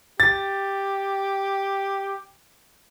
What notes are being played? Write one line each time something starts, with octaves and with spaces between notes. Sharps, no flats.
G4 A6